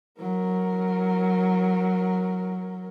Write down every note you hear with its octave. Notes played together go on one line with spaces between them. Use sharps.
F#3 A#4